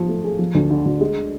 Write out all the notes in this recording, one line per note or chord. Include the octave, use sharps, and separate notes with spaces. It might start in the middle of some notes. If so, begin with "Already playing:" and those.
Already playing: F3 F4
A3
G#4
F3
D2
D3
D2
G#3